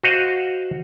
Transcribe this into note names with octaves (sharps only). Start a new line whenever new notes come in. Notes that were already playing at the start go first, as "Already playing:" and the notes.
F#4 C5 D#5 F5 F#5